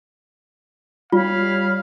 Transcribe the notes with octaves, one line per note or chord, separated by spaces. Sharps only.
G3 F4 C#5 F5 B5